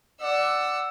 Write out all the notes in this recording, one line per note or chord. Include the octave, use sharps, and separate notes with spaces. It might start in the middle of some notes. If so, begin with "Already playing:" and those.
D5 F#5 E6